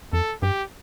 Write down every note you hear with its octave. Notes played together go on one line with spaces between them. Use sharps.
F2 A4
G2 G4